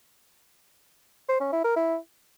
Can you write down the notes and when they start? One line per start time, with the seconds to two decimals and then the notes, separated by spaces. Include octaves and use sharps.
1.28 C5
1.40 C#4
1.52 E4
1.64 A#4
1.76 E4